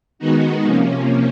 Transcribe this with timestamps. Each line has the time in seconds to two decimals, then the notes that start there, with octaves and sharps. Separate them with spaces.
0.19 D#3 G#3 B3 D#4 F#4
0.65 C3 F3 A#3 C#4